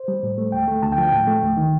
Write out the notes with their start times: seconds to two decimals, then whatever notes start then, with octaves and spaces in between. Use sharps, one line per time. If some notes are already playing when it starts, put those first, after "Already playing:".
Already playing: C5
0.08 G3
0.23 A2
0.38 A3
0.52 D2 G5
0.68 A3
0.83 D2 A5
0.92 G5
0.98 F3
1.03 G5
1.13 A2
1.27 A3
1.43 D2
1.57 D#3